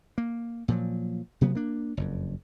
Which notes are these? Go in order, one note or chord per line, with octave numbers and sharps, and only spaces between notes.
A#3
A#2 F3 F#3
C3 F#3 A#3 B3
A#3 D4
F#1 F2